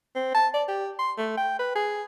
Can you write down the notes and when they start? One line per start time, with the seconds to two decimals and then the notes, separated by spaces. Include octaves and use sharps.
0.15 C4
0.34 A5
0.54 D5
0.68 G4
0.99 C6
1.17 A3
1.37 G5
1.59 B4
1.75 G#4